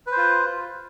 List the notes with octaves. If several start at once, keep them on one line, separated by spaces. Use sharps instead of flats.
F4 B4 C5